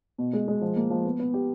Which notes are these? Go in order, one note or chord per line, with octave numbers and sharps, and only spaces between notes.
B2
G#3
G#3
F3
A#3
F3
B3
B3
G4